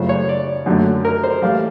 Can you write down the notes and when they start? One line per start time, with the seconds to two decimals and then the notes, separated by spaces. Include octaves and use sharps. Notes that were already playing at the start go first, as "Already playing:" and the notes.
Already playing: F#2 C#3 F3 A3 C5
0.09 C#5
0.29 D5
0.66 F#2 D3 F#3 A3
1.05 A#4
1.23 C5
1.42 A2 E3 G3 F5